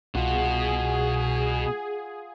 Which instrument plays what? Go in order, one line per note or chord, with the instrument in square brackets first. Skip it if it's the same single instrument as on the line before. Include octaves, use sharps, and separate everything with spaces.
[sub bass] C2 [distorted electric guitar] B2 [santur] F4 F#5 [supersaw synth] G#4